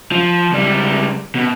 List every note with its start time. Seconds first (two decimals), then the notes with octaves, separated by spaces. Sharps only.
0.11 F3
0.53 C#2 G3
1.35 B2